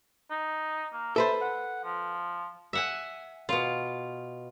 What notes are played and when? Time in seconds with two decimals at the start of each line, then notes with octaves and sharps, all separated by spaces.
0.30 D#4
0.93 A#3
1.16 A4 B4 C5 E5
1.41 F#5
1.84 F3
2.73 E5 F#5 G#5
3.49 B2 F4